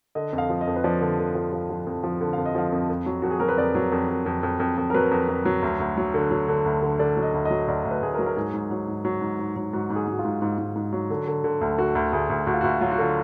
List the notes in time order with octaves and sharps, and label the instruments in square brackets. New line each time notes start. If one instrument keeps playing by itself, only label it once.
[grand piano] D3 D#5
F2
F5
F3
D#5
F2
B4
F3 D5
D3
D3
F3
F3
F3
F2
F3
D3
F2 F5
D#5
F3 F5
F2
F2
F#3
F2 F#4
G#4
F#3 A#4
B4
F2 D5
F#3
F2
F2
F2
F2
F2
F2
A#4
F#3 B4
F2
F2
F#3
D2
D2
F#3
D3
F#3
D3
D2
D3
D3 D5
F#3
D#5
D2
D#5
F#3
D2 D5
D2
B4
D2 G#4
A#4
F#3
A#4
G#2 G#4
G#2
F#3
G#2
F#3
G#2
G#2
F#3
G#2 F#4
G#2
G#4
G#2 F#4
F4
G#2
G#2
G#2
G#2
F#3
D3
D3
D3
D2
D3 F#4
D2
D2 G#4
D2
D2 F#4
F4
D2 F#4
F#3 F4
F#4
D3 F4